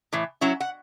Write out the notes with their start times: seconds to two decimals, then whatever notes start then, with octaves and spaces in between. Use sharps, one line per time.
0.13 A2 E3
0.41 F#3 C#4 E4
0.60 F#5